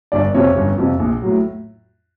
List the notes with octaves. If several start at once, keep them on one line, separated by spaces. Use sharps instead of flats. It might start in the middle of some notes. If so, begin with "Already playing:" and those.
G1 D4 D5
F2 C3 F3 C#4 C#5
G1
F2 C3 F3
A#1
A2 F#3